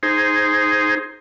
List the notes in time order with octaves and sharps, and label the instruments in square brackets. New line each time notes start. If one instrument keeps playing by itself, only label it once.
[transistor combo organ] D#4 G#4 C5